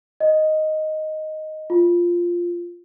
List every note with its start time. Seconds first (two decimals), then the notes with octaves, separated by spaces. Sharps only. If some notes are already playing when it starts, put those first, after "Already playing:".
0.20 D#5
1.70 F4